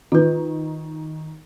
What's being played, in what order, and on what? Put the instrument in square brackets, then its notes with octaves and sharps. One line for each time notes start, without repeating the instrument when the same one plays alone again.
[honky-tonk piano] D#3 [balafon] F4 B4